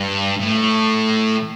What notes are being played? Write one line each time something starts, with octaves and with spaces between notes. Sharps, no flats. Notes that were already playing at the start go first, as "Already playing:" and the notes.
Already playing: G2
A2